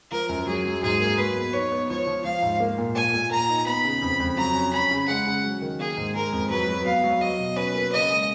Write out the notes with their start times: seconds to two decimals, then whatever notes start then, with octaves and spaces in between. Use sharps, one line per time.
0.11 F3 A#4
0.29 F#2
0.47 F#3 G#4
0.65 F#3
0.83 G#2 G#4
1.00 A#3
1.18 F#3 B4
1.36 B3
1.53 D#4 C#5
1.71 B3
1.89 F3 C#5
2.07 F3
2.24 F3 F5
2.42 G#2
2.60 A#3
2.78 A#2
2.95 A#2 G#5
3.14 A#2
3.31 A#2 A#5
3.49 D#4
3.66 B3 B5
3.84 C#3
4.02 F2
4.20 F2
4.37 F#3 A#5
4.55 C#4
4.73 C#4 B5
4.91 C#3
5.08 G#3 F#5
5.27 C#3
5.44 F#3
5.62 D#3
5.79 A#3 G#4
5.97 G#2
6.15 G#3 A#4
6.32 F2
6.50 F#3 B4
6.67 F#3
6.85 B3 F5
7.03 F#3
7.21 F#3 D#5
7.39 B2
7.56 C#4 B4
7.74 A#3
7.92 C#3 D#5
8.10 G#3